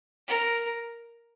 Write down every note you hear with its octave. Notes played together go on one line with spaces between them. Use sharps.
A#4